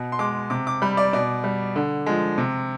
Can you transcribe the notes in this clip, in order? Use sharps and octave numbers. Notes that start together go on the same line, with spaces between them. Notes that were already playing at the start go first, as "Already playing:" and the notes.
Already playing: B2
C6
G#3 D6
C3 D6
D6
G3 B5
D5
B2 D5
G3
D3
F3 G#3
C3